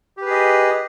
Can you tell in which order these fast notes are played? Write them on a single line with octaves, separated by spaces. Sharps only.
G4 B4 G#4 D#5